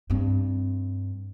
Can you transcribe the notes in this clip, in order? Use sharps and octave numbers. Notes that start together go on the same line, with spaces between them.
G2 C4